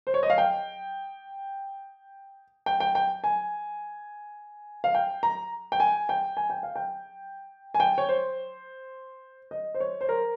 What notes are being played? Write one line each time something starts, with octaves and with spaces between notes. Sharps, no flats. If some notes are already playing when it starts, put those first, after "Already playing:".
C5
C#5
D#5
F5
G5
G5
G5
G5
G#5
F5
G5
A#5
G5
G#5
G5
G#5
G5
F5
G5
G#5
G5
C#5
C5
D#5
C5
C#5
C5
A#4